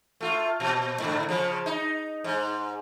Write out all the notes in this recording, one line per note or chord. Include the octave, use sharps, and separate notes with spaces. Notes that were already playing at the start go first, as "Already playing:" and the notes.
A3 F4
A#2
G#2 D3
C#3 F3
D#4
G#2